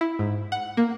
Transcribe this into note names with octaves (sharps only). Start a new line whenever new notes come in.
E4
G#2
F#5
A#3